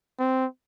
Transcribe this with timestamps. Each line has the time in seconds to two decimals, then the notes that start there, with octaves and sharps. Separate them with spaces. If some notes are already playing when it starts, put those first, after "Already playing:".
0.19 C4